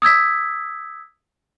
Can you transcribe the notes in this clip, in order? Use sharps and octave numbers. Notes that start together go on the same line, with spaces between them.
D#6 E6 G#6 B6